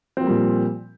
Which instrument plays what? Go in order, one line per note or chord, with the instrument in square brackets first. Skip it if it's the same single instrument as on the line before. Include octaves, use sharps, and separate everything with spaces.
[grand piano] C4
F3
A#3
G3
A#2